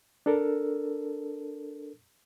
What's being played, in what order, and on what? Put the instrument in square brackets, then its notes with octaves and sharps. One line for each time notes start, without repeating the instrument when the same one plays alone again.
[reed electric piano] D4 A4 A#4